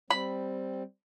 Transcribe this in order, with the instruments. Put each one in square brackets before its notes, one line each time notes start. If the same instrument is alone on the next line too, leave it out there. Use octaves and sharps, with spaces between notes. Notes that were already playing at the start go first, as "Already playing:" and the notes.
[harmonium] G3 C4 [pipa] B5